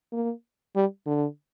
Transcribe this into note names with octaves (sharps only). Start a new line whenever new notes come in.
A#3
G3
D3